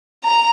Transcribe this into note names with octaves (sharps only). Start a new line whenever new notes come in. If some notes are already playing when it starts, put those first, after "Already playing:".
A#5